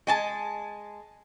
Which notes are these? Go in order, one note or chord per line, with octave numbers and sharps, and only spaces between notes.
G#3 G#5 A5